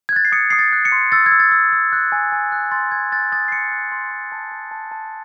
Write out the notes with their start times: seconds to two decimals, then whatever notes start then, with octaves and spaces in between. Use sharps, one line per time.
0.09 G#6
0.13 F#6 A6
0.25 C7
0.32 D#6 C#7
0.50 D#6 C7
0.59 A6
0.73 F#6
0.85 C#7
0.92 C6
1.12 E6 A6
1.26 G#6
1.32 E6
1.40 A6
1.52 E6
1.73 E6
1.93 F#6
2.12 G#5
2.32 G#5
2.52 F#6
2.72 C6 A6
2.91 C6 G#6
3.12 F#6 A6
3.32 D#6 A6
3.48 C7
3.52 C6 C#7
3.72 F#6
3.92 C6
4.11 C6
4.32 A5
4.52 A5
4.71 A5
4.91 A5